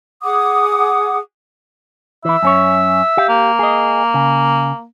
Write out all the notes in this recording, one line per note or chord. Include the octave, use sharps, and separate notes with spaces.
G#4 F#5 D6 D#6
E3 E4 E5
F#2 C#4 C#5
G4 F5
A#3
G#4 D#5
C#3